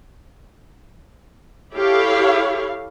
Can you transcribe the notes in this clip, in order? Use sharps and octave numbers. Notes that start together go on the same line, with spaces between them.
E4 G4 A4 C#5 F5